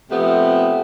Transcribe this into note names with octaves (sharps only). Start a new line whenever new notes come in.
C3 F3 A3 B3